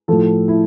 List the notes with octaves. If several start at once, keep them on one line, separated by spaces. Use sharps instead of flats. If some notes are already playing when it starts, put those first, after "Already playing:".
A2 F3 A4
E4